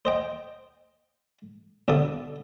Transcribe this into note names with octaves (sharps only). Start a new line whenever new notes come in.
C5 D#5 G5
B1 G2 D3 A4 D#6